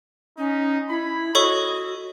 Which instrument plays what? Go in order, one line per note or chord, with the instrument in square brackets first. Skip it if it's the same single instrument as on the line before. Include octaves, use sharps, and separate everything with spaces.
[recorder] C#4 [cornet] D#4
[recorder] E4 [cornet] B5
[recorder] F#4 [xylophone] A4 C#5 C#6 [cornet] D#5